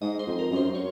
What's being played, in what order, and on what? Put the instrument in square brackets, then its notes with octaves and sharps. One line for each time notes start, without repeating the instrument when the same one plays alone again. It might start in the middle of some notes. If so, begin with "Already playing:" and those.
[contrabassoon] G#2 [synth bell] D#5
[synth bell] C5
[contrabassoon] F2
[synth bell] A#4
[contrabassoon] F#2
[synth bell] C5
C#5